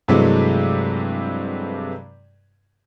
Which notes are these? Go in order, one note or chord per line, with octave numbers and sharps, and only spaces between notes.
G2 C3 E3 F#3 G#3 A3